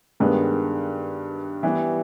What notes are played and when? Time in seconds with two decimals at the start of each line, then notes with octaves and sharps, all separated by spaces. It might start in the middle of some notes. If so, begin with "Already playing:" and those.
0.20 G2 D#3 G#3 B3
1.63 E3 G3 B3